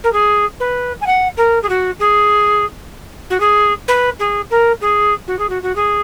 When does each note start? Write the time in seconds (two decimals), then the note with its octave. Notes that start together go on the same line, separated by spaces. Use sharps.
0.04 A#4
0.13 G#4
0.60 B4
1.01 G#5
1.06 F#5
1.37 A#4
1.62 G#4
1.69 F#4
2.00 G#4
3.30 F#4
3.40 G#4
3.88 B4
4.19 G#4
4.50 A#4
4.81 G#4
5.28 F#4
5.39 G#4
5.49 F#4
5.63 F#4
5.76 G#4